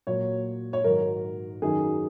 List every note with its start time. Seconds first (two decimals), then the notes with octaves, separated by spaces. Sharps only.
0.07 A#2 F#3 C#5
0.73 C#5
0.84 G#2 D#3 F#3 A#4
1.62 F#2 D#3 F#3 G#4